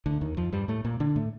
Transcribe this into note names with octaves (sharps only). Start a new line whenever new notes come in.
D2 D3
D#2 D#3
F2 F3
G2 G3
A2 A3
A#2 A#3
D3 D4
A2 A3